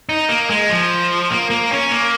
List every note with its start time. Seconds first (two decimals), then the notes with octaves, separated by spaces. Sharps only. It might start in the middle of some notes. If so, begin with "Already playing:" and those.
0.09 D#4
0.29 A#3
0.50 G#3
0.69 F3
1.31 A#3
1.50 A#3
1.71 C#4
1.91 A#3